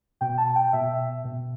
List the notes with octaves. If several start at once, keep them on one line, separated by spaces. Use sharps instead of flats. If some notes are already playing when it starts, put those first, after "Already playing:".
B2 G5
A5
G5
B2 E5
B2